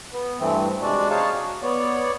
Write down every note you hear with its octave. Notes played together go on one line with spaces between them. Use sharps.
B3
G2 E3 A3 C4
C3 G#3 D4 F#4 D5
D#4 G#4 C#5 F5 A5
F#4
B3 C#5 D5